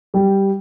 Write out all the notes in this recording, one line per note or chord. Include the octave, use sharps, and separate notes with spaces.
G3 G4